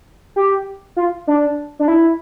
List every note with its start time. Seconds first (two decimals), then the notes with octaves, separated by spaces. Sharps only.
0.36 G4
0.96 F4
1.27 D4
1.79 D4
1.88 E4